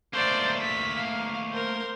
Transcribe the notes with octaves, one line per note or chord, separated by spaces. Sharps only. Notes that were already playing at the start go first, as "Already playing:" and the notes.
A3 A#3 C5 D5
B6
F5
A#4 C5